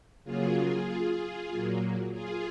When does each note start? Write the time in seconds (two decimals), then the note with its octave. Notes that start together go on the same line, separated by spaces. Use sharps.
0.24 C#3 F#3 A#3 F4 G#4
1.50 A#2 F#3 A#3
2.12 F4 G#4